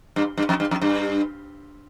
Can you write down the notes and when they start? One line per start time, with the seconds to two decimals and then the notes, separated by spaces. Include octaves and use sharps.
0.16 G2
0.37 G2
0.49 F2
0.60 G2
0.71 F2
0.81 G2